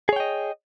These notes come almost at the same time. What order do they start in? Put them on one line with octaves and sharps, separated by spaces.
G#4 C#5 G5 D#5